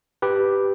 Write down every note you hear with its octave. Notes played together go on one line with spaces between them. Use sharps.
G4 B4